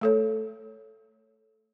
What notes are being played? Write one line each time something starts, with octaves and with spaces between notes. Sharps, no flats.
A3 A4 C#5